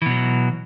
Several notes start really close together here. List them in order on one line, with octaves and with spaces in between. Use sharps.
E3 B2 F#3